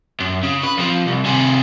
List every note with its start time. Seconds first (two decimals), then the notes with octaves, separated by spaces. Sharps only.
0.20 F#2
0.43 C#3
0.63 B4
0.77 F2 F3
1.06 C2
1.25 C3 G#4